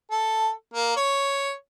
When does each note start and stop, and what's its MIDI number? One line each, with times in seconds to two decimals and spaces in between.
0.11 0.51 69
0.74 0.93 58
0.96 1.52 73